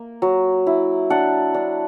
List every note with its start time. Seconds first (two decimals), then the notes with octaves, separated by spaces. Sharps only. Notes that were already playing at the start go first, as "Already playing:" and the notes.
Already playing: A#3
0.22 F#3
0.67 E4
1.10 D4 F#5
1.54 D4